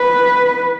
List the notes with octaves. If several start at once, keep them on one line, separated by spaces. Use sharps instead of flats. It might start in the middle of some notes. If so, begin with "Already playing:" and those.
Already playing: B4